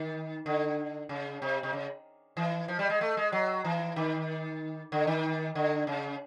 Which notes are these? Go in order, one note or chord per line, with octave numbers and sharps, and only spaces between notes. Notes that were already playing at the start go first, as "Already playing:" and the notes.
Already playing: D#3
D3
C#3
C3
C3
C#3
E3
F3
G3
G#3
A3
G#3
F#3
E3
D#3
D3
D#3
D3
C#3